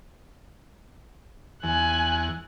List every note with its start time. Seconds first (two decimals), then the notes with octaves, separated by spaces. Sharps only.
1.63 E2 G#5 F#6